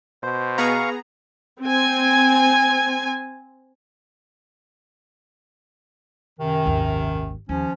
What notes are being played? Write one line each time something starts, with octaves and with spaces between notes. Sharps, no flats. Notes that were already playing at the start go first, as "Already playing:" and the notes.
B2 C5
B3 G#4 F5 A#5 C#6
C4 G#5
F#2 C3 D#3
G#1 D#2
D#2 F3 C#4